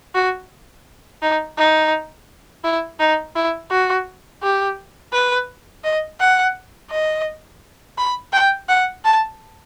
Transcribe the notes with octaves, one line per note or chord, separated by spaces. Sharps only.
F#4
D#4
D#4
E4
D#4
E4
F#4
G4
B4
D#5
F#5
D#5
B5
G5
F#5
A5